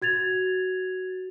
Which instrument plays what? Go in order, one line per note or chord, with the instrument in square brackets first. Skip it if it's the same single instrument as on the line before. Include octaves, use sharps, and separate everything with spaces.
[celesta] F#4 G#6 A6 F7